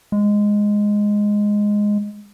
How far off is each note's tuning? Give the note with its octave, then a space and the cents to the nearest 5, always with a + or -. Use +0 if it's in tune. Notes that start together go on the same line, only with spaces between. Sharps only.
G#3 -5